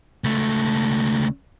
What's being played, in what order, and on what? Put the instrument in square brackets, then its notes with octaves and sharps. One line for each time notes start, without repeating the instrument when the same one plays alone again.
[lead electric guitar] C#2 A3